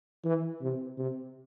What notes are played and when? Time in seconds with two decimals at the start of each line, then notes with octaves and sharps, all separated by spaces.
0.25 E3
0.62 C3
0.98 C3